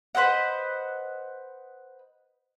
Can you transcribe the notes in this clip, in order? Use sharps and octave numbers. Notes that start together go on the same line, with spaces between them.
B4 C5 D#5 F#5